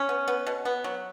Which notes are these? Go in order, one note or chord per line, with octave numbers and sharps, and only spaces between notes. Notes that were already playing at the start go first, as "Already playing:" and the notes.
Already playing: C#4
B3
B3
B2
B3
F#3